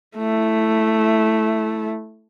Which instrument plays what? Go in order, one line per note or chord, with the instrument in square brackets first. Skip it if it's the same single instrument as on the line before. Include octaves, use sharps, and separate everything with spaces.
[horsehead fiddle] A3 E4